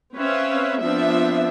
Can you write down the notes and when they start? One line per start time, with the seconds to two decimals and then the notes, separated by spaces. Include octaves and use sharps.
0.16 C4 C#4 B4 C#5 E5 F5
0.81 F3 B3 C4 D4 F4 E5